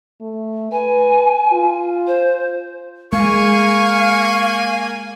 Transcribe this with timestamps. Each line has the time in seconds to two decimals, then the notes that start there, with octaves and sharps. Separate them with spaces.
0.21 A3
0.72 B4 G#5
1.52 F4
2.07 C5
3.13 G#3 A#3 F5 G#5 C#6